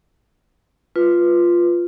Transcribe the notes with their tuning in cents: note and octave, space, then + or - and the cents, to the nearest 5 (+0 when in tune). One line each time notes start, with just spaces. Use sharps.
F4 +0 B4 -5